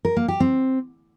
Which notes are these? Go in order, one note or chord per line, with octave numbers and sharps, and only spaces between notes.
A#4
A#3
G4
C4